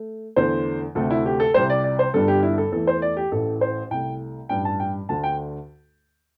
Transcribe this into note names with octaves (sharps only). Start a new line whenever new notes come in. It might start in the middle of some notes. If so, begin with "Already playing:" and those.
Already playing: A3
E2 D3 A3 C5
D2 C3 A3 A4
E4
G4
A4
C2 C3 G3 C5
D5
D5
C5
G1 G2 D3 G3 A4
G4
E4
A4
E2 E3 A3 A4
C5
D5
G4
A1 A2 A3 A4
C5
C2 C3 A3 G5
A1 G2 G3 G5
A5
G5
D2 D3 A3 A5
G5